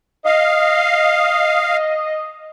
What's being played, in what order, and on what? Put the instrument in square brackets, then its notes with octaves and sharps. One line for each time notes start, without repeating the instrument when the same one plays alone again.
[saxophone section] D#5 [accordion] F5